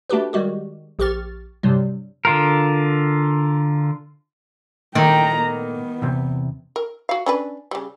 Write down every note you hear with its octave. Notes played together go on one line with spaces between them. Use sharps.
A3 D4 F#4 G4 B4
D#3 G3 G#3 F#4 G4
A#1 G4 C#6 F6 A6
G2 C3 F#3 G3
D3 F4 A#4
A#2 D#3 A3 A#3 G5 A#5
B3
E2 C3
A#4
F#4 F5
C#4 D4 B4
C#3 G3